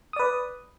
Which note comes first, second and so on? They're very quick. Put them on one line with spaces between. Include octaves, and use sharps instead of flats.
D#6 D5 B4